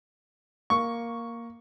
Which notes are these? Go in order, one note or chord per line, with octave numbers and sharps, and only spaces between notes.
A#3 C#6